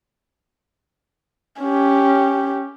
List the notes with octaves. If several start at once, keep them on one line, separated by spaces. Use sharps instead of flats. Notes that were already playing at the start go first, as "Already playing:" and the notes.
C#4 G4